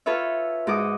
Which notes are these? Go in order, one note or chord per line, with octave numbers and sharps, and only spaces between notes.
F4 A4 B4 C#5 E5
G#2 F#4 A4 D6 D#6